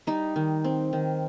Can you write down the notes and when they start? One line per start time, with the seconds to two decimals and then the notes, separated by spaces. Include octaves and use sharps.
0.07 G3 D#4
0.36 D#3
0.64 C4
0.93 D#3